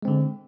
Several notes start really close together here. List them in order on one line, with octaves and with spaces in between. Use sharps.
G#3 C4 D3